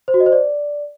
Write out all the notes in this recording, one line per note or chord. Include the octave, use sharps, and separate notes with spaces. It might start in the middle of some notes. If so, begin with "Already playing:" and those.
C5
F#4
D#5
C5
D5